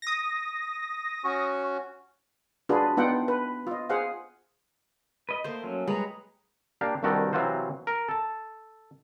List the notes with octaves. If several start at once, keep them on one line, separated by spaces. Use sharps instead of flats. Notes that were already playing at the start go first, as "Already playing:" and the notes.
D#6 A#6
C#4 F#4 C#6
D4 F4 F#4 G#4 B4
B3 D4 D#4 F4 F#5 G5
B4
F4 D#5
G#4 C5 F5 F#5
B4 D#5
A3 A#3 C5
F#3 C#4
G3 G#3 G#4 B4 C#5 A#5
A#3 D4 G4 F5
C2 G2 D#3 F#4 G4 A4
C3 E3 F#3 F4 F#4 C5
A#4
A4 A5